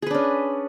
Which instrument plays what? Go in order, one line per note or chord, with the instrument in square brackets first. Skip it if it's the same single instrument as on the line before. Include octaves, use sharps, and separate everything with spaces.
[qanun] G#4
B4
D4
C#4